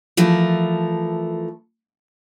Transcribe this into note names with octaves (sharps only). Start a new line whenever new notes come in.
E3 F3 A3 A#4